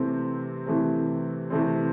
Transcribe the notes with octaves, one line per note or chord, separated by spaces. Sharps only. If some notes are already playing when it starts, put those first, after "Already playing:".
Already playing: C3 E3 A3 C4
C3 E3 A3 C4
C3 E3 A3 C4